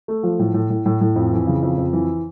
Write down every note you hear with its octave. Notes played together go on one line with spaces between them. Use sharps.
A3
F3
A2
A2
A2
A2
A2
F2
E3
C#3
F2
F2
E3